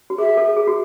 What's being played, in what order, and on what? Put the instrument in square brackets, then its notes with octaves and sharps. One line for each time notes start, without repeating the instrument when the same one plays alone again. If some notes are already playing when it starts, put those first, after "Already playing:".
[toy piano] F#4
[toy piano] G#4 [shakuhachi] E5
[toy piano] A4
G#4
F#4